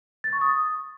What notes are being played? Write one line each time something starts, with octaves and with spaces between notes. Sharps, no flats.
A6
C#6
D#6